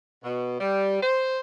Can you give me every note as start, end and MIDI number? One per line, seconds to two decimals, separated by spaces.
0.24 0.58 47
0.60 1.01 55
1.02 1.40 72